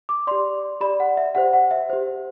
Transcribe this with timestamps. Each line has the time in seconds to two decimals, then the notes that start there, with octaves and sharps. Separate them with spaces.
0.09 D6
0.27 G4 D5 C6
0.81 G4 D5 B5
1.00 F#5
1.17 E5
1.35 G4 C5 F#5
1.53 F#5
1.71 E5
1.90 G4 C5